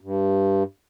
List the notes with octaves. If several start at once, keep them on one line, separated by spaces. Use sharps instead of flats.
G2